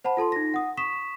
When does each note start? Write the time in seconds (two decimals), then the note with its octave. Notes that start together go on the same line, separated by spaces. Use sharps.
0.04 C5 F#5 A5 B5
0.17 F4 A4 A5 C6
0.32 D#4 A#6
0.54 F#5 D#6
0.77 C#6 D#6 B6 E7